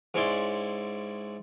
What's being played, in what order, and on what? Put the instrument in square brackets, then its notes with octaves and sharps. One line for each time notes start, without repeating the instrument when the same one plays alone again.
[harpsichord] G#2 G#3 C#4 E4 D5 C6